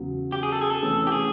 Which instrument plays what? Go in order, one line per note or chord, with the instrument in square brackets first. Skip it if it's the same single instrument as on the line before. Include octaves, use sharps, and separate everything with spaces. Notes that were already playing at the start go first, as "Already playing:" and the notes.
Already playing: [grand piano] E2 C#3 F#3
[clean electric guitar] G4
G#4
A4
G#4
A4
[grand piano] C3 E3 A3 C#4
[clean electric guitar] G4
G#4